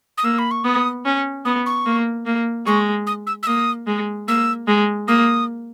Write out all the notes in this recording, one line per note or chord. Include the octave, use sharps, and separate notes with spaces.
D#6
A#3 E6
B5
C#6
B3 D#6
C#4
B3 D#6
C#6
A#3
A#3
G#3 C#6
D#6
E6
E6
A#3 D#6
G#3
A#3 E6
G#3
A#3 D#6